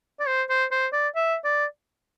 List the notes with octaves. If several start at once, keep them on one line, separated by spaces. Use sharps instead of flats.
D5
C5
C5
C5
D5
E5
D5